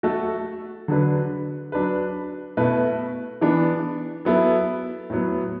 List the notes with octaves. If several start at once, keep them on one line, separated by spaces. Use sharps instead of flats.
A3 F#4 A4
D3 F#3 D4 B4
F#3 D4 B4
B2 A3 E4 B4
E3 B3 D4
F#3 B3 E4 A4
A2 F#3 B3